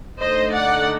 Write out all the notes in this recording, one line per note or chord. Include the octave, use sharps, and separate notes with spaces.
D3 A3 D#4 C5 D#5
D5 F#5